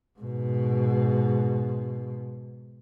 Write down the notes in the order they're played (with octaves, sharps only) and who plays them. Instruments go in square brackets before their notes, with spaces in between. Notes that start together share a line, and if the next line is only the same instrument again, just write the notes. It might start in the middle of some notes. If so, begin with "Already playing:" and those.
[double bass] G#2 B2